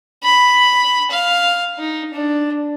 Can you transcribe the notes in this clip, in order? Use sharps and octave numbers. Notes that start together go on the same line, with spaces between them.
B5
F5
D#4
D4